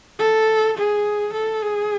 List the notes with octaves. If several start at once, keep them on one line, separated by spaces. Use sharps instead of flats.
A4
G#4
A4
G#4